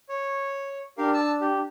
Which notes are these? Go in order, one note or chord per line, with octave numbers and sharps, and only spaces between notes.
C#5
D4 G4 A#4 F5
A5 E6
G4